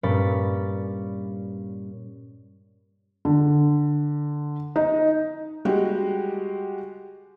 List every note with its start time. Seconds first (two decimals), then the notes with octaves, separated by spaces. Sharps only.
0.03 G2 A#2 C#4 D5 B5 A6
3.25 D3
4.76 D#4
5.65 G3 G#3 F#4 G4